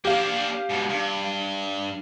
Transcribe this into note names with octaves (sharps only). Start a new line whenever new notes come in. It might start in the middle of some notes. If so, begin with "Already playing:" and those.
A#3 D4 G4 F5
G#2 B2
G2